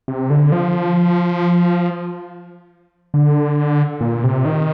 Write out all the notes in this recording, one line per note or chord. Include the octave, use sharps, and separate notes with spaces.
C3
D3
F3
D3
A#2
C3
D#3